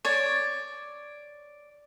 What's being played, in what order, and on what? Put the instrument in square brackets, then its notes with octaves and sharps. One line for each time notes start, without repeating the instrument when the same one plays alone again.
[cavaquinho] C#5 D5